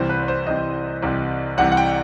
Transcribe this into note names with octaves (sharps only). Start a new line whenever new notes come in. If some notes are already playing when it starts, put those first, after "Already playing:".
Already playing: C2 C3 E3 C5
B4
B4
C5
C2 C3 E3 D#5
C2 C3 E3
C2 C3 E3 F#5
F#5
G5